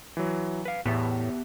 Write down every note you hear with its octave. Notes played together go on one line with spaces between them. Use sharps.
E3 F#3
B4 F5
E2 A2 B3 G4 E5